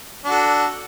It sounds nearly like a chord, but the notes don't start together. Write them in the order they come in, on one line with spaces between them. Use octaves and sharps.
D4 F#4 A4